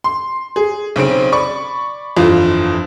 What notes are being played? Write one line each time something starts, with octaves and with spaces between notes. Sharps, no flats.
C6
G#4
B1 C#3 C4 D7
D5 B5 C#6
G1 F2 E3 F4